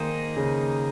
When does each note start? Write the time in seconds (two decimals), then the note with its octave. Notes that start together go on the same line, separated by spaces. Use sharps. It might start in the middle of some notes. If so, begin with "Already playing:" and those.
Already playing: D#3 A#3 D#4 G#4 C5
0.37 C#3